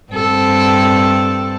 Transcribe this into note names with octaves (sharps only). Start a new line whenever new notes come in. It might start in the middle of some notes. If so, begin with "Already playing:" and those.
G2 C4 A4